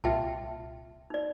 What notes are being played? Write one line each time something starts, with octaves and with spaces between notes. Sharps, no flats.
C2 A#2 F4 E5 G5 A5
D#4 D5